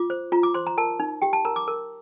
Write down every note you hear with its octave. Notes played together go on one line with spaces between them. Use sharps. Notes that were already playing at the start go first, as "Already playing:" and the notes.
Already playing: F4 D6
C5
F4 A#5
D6
C5 C6
A#5
A#4 A5
D#4
G4 G5
A5
A#4 A#5
D6
A#4